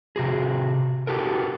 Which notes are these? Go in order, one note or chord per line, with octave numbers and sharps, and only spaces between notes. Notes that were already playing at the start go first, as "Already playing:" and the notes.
C3 F#4 G#4
F#4 G4 A4 A#4